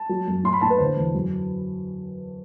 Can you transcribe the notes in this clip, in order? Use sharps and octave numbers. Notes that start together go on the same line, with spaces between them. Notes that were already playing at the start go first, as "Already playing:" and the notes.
Already playing: A5
F#3
F#2
A2 C6
B5
A2 A5
B4
D3 C5
E2
F#2